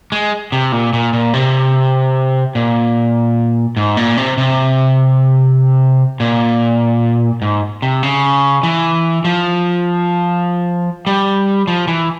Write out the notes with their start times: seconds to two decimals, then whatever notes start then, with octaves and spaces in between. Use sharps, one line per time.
0.12 G#3
0.52 C3
0.72 A#2
0.93 A#2
1.13 A#2
1.34 C3
2.55 A#2
3.77 G#2
3.97 A#2
4.17 C3
4.38 C3
6.20 A#2
7.42 G#2
7.82 C3
8.03 C#3
8.63 E3
9.25 F3
11.07 G3
11.67 F3
11.87 E3